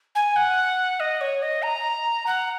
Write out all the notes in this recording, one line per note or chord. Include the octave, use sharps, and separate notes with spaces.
G#5
F#5
D#5
C#5
D#5
A#5
F#5